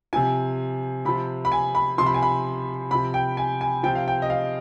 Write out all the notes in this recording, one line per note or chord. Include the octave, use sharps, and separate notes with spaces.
C3 F3 G#5
C3 F3 B5
B5
G#5
B5
C3 F3 C6
B5
G#5
B5
C3 F3 B5
G5
G#5
G#5
C3 F3 G5
F5
G5
D#5
F5